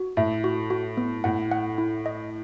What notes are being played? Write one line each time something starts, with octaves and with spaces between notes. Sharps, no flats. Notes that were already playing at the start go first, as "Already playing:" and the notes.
Already playing: F#4
A2 E5
F#4
F#4
B3
A2 F#5
F#5
E4
D#5